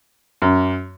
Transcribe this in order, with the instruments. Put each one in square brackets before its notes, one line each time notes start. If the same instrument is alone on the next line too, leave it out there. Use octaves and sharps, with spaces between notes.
[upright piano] F#2